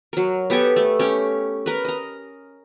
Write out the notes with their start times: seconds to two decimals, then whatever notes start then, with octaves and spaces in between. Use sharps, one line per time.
0.13 F#3 A#4
0.50 B3 G4 A4 G#5
0.76 A3
1.00 C#4 G4
1.66 A#4 B4
1.85 D#5 A#5